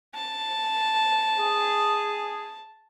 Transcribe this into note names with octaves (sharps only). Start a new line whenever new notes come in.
A5
G#4